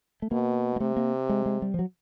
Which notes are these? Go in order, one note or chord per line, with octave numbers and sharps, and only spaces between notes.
A3
B2 A#3
A#3
C3 A3
A#3
G#3
G#3
G3
F3
F#3